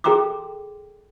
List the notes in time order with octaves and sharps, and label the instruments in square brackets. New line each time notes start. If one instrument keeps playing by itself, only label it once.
[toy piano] G#4 A4 G5 A#5 C6 D6